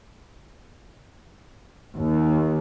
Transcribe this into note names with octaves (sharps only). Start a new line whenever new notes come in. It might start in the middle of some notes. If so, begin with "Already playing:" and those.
D#2